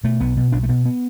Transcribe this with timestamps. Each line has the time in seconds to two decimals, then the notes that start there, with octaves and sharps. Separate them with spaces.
0.04 B2 A3
0.20 B1 B3
0.36 B2 B3
0.52 B1 D4
0.63 A3
0.69 B2 B3
0.85 B3